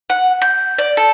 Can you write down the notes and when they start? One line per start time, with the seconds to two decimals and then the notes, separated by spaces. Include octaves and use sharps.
0.10 F#5
0.42 G6
0.78 D5
0.97 A4